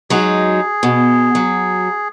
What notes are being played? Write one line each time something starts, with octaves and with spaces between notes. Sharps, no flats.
F#3 G#3 D#4 G#4
B2
F#3